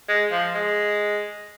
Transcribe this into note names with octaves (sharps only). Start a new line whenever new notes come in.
G#3
F3
G#3